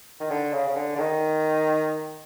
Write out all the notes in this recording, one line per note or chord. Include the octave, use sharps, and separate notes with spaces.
D#3
D3
C#3
C#3
D3
D3
D#3